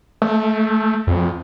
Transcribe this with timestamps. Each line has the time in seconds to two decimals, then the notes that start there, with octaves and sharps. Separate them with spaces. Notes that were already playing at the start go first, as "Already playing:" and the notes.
0.22 A3
1.07 F2